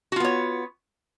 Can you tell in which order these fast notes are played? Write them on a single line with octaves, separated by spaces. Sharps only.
F#4 F4 B3 C#5